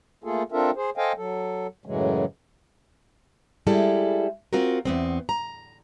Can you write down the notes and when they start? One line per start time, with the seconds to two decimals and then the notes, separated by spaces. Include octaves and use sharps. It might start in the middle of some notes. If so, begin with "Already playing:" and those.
0.24 A3 A#3 F4 G#4 A4
0.52 C4 D4 F4 A4 A#4 E5
0.76 G#4 C5
0.97 A4 C5 D#5 F5 G5 G#5
1.17 F#3 A4
1.86 F#2 A2 C#3 E3 F#3 G#3
3.67 G3 G#3 E4 A4
4.53 C4 F4 F#4 A#4
4.85 E2 B3 C4
5.29 A#5